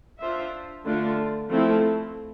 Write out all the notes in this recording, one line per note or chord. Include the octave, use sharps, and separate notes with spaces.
D4 F4 C5 E5
D3 A3 D4 F4
F3 A3 C4 E4